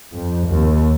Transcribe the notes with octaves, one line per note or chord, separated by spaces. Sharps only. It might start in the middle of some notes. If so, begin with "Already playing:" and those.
F2
D#2